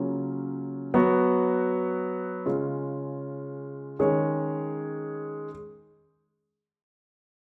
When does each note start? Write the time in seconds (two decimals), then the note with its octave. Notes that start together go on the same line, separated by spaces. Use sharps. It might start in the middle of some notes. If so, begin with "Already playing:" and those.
Already playing: C#3 F#3 A#3 C#4 F4
0.94 F#3 B3 F#4
2.46 C#3 G#3 C#4 F4
3.99 D#3 G#3 C#4 G#4 C#5